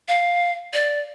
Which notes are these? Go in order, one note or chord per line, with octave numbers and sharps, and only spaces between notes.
F5
D5